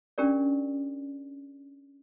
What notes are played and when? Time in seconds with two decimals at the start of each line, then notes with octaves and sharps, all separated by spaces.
0.18 C#4 D4 G4 A#4 D5